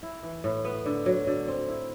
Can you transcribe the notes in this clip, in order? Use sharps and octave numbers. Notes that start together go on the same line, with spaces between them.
E4
E3
A2
B3
D3
F#3
D3
C4
E4